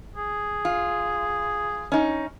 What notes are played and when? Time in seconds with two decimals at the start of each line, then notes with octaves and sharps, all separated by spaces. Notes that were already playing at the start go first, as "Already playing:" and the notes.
0.16 G#4
0.65 F4
1.92 C#4 D#4